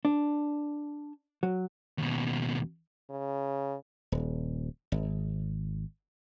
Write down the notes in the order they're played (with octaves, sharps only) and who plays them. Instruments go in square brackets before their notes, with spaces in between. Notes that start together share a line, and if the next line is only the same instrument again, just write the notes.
[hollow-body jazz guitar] D4
F#3
[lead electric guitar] D#2 B2
[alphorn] C#3
[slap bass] D#1
G#1